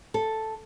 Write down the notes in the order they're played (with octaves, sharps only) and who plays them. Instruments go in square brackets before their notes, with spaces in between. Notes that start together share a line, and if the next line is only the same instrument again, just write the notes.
[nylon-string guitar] A4